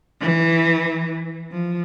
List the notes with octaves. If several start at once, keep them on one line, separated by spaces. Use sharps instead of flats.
E3
F3